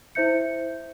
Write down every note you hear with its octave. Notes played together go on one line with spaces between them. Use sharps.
E4 C5 E5 G6 C#7